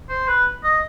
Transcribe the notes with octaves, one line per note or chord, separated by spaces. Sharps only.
C5
B4
D#5